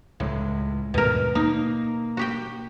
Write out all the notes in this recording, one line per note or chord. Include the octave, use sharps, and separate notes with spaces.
C#2 A2 G#3
D#2 G#2 B2 A#4
A#3 D#4
F#4 G4 G5